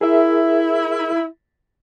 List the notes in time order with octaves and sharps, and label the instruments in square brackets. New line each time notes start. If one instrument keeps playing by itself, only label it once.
[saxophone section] E4 [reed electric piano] G#4 A#4 E5